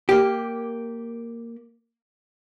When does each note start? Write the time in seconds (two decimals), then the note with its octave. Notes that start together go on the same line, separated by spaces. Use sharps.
0.09 A#3 G4